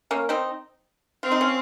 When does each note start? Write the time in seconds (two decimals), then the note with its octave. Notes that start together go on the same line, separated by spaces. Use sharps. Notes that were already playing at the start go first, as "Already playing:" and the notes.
0.11 A#3 C#4
0.29 C4 D#4
1.23 C4 F4
1.31 D#4
1.41 C#4 F4